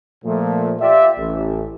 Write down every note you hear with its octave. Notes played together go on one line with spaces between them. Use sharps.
A#2 F3 A3
F4 G4 D5 E5
A1